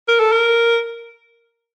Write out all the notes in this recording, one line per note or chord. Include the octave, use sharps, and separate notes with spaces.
A#4
A4
A#4